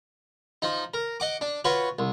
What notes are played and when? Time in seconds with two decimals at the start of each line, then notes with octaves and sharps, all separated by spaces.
0.62 F3 D#4
0.94 A#4
1.20 D#5 F#5 D6
1.41 D4
1.65 F4 F#4 B4 C#5
1.99 C2